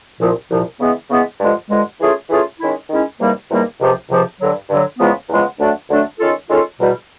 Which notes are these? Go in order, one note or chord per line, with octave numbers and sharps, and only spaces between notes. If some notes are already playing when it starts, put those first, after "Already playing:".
C2 A#2 F3
C2 A#2 F3
C#3 E3 G#3 B3
C#3 E3 G#3 B3
G2 D3 F3 G#3
G2 D3 F3 G#3
E3 A3 C#4 F4 G#4
E3 A3 C#4 F4 G#4
D#3 G#3 C#4 E4
D#3 G#3 C#4 E4
E2 C3 D#3 G3 A#3
E2 C3 D#3 G3 A#3
C#2 C3 F3
C#2 C3 F3
G2 D3 F#3
G2 D3 F#3
E2 C#3 F3 G#3 B3
E2 C#3 F3 G#3 B3
D2 D3 F#3 A3 D4
D2 D3 F#3 A3 D4
D#3 G#3 C#4 F4 A4
D#3 G#3 C#4 F4 A4
E2 B2 G3